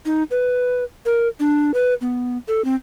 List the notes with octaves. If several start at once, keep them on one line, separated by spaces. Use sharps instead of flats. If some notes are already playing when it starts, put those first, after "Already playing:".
D#4
B4
A#4
D4
B4
B3
A4
C4